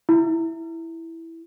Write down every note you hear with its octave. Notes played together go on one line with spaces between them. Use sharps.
E4